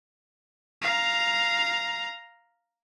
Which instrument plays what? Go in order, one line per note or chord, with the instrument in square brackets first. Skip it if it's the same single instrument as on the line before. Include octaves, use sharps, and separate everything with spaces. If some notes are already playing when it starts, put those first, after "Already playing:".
[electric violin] F5 A#5